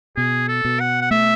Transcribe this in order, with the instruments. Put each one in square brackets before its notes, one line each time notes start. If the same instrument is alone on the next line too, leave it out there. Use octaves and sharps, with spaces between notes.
[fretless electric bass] B2 [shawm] G#4
[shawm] A4
[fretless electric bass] B2
[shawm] F#5
F#5
[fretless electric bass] A3 [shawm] E5